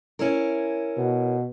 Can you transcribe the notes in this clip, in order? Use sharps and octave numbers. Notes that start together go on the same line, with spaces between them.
C#4 E4 A#4
B2